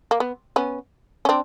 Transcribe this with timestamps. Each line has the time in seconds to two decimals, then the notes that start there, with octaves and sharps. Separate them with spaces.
0.11 A#3
0.20 B3
0.56 B3 C#4
1.25 C#4
1.29 C4 D4